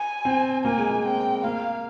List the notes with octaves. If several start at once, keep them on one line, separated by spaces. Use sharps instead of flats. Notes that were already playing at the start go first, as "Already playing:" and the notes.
Already playing: G#5
C4
A#3 G#5
G#3
A#3
C4 G5
A#3 F5